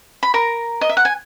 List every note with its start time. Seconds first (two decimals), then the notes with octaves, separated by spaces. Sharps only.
0.23 B5
0.34 A#4 A#5
0.81 D#5
0.89 E5
0.97 F#5
1.05 G#5